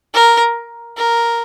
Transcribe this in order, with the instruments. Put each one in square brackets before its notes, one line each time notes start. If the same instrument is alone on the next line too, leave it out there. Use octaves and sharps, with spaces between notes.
[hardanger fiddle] A#4
A#4